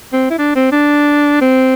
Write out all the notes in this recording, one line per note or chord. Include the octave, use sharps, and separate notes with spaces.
C4
E4
D4
C4
D4
C4